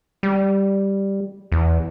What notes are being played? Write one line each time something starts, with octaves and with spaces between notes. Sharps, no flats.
G3
E2